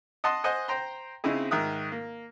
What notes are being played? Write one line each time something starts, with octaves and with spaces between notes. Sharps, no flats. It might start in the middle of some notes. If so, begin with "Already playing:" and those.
D#5 F#5 A5 C6 D#6
C5 D#5 F#5 G#5
C5 G5 A#5 C6
C#3 C4 D#4 E4 G#4
G#2 D#3 E5 D#6 F#6
A#3